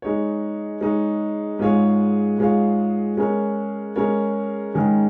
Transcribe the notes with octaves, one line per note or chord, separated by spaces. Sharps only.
G#3 D#4 C#5
G#3 D#4 C#5
G#2 G#3 F4 C#5 F5
G#2 G#3 F4 C#5 F5
G#3 C#4 A#4 C#5
G#3 C#4 A#4 C#5
G#2 D#3 G#3 C#4 G#4